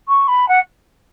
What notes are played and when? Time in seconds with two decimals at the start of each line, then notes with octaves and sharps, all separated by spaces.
0.08 C#6
0.28 B5
0.48 F#5